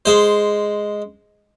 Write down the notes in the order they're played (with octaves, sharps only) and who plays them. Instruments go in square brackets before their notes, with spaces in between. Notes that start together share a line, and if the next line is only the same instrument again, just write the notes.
[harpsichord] G#3 C5